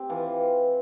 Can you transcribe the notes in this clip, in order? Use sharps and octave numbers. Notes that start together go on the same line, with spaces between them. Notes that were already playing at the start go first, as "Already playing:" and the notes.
Already playing: C4 G4
E3 F4